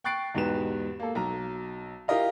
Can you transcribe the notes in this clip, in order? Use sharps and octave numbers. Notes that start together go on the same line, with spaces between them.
G5 C#6 F#6 A6 C7 D7
E2 G#2 B2 G4 B4 E7
A#3 A4
B1 A#5
E4 F4 G4 A#4 D#5 F5